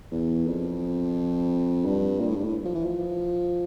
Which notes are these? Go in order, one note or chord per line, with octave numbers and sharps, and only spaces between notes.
E2
F2
G2
A#2
A2
G2
A2
F3
E3
F3